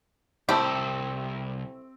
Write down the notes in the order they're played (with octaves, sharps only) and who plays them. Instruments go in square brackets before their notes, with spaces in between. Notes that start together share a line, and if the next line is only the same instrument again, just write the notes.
[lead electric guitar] C2 [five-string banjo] A3 E4 [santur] C4 [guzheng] G4